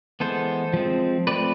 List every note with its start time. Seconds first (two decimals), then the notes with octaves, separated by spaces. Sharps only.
0.20 E3 G#3 B3 A4 C5
0.73 F3 G#3 C4
1.27 F3 A3 C4 B4 D5